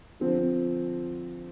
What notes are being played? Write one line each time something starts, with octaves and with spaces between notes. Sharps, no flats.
D3 F3 C4